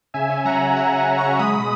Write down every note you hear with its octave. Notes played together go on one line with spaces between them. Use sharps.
C#3 E5 G#5
C#4
F#3 F#5 A#5
F#3
C#3 F#5 A#5
F#3
F#5 A#5
F#3
A#5 C#6
C#3
G#3 B5 D#6
B2